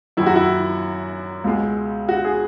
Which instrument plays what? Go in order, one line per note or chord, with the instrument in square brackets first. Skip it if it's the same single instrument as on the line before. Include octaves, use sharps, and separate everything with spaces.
[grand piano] F#2 D#3 F#3 [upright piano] E4
[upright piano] F#4
E4
[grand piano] C#2 B2 G#3
[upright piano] F#4
G#4